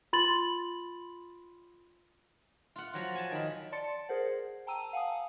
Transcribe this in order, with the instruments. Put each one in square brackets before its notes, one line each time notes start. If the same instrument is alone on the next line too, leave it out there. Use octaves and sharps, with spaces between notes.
[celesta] F4 B5 C6 A6 F#7
[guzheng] F4 F#5
F3 F#3 F#5
G#5 A5
D#3 B5
[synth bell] D5 A5 C6 A6 C#7
G#4 A#4 C5 F#5
G5 A5 A#5 E6 D#7
F5 F#5 G#5 A5 D#6